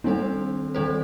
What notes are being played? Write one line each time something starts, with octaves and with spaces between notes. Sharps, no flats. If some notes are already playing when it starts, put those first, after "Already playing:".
D#3 G3 C4 D4 A4 C5
D#3 G3 D4 A4 C5